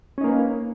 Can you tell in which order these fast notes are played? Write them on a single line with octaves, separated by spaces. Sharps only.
C#4 D#4 A#3 B4